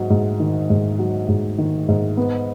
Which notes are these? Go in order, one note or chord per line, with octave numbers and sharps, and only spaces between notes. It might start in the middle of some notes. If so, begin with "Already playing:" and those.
Already playing: G#2 F#3
G#2
D#3
G#2
F#3
G#2
D#3
G#2
B3